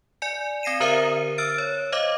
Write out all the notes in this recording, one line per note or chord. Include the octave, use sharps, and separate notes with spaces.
D5 G#5 C#7
C4 A#6 C7 D#7 E7
D3 A#4 C5 E5 D#6 D#7
E6 F6 A6 D7
C#5
C5 D#5 F5 D6